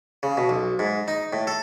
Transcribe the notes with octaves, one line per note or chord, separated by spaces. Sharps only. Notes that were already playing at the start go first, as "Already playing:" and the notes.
C#3
B2
B1
G#2
D#4
A2
A4